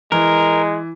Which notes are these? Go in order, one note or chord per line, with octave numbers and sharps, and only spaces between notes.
E3 G#3 A#4